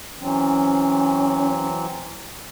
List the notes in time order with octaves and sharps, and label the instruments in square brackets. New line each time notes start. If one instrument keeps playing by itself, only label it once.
[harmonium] E3 F#3 C4 [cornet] C#4